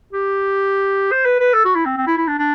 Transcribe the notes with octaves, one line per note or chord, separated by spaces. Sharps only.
G4
C5
B4
B4
A4
F#4
E4
C4
C4
E4
E4
D4
D4